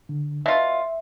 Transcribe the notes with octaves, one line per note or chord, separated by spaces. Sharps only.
D3
B2 F4 E5